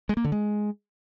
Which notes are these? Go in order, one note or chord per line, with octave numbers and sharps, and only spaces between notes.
G#3
A#3
D3
G#3